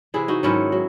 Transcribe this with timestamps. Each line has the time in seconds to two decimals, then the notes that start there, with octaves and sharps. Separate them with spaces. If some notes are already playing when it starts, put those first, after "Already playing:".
0.14 C3 E3 E4 G#4
0.28 D#4 F#4
0.43 G#2 D#3 F#3 C#4 E4
0.72 F#3